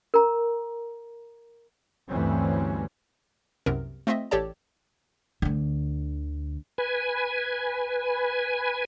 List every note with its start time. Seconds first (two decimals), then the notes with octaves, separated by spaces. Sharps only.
0.14 A#4 A#5
2.08 D2 G2 E3 G3 C4 C#4
3.66 C2 F#2 C3 B3 A#4
4.07 A3 C4 F4 D#5 E5
4.31 A1 G4 A4 C#5 D5 A5
5.42 D2 D3
6.78 B4 G#5